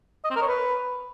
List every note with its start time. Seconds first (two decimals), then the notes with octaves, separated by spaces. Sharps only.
0.25 D#5
0.30 C4
0.36 A#4
0.42 C#5
0.48 B4